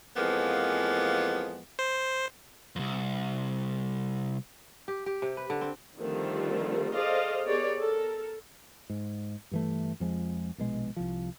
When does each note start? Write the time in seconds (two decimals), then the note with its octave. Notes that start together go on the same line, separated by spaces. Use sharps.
0.17 F2 E3 F3 G#3 A#3 B3
1.79 C5
2.76 C2 F2
4.88 G4
5.06 G4
5.22 C3
5.37 B4
5.50 D3
5.61 C4
5.98 D3 D#3 F3 G3 A3 C4
6.94 G#4 A4 C5 D5 D#5 F5
7.45 B3 G4 G#4 A#4 C#5 D5
7.79 A4 A#4
8.90 G#2
9.51 G2 E3 A3
10.00 F2 F3 G#3
10.58 A#1 B2 G#3
10.97 C2 F3